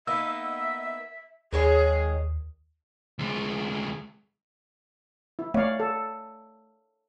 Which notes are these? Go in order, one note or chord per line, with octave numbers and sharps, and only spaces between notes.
A#3 B3 D#4 E5 E6
D#2 D#3 G#3 G#4 C#5
D2 G#3
E4
A3 C#5 D5 F5
A4